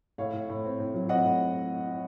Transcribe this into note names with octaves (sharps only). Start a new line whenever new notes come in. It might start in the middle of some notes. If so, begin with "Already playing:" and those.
A2 C#5 F5
A2
A2
C4
A2
F#3
C4 D#5 F#5
A2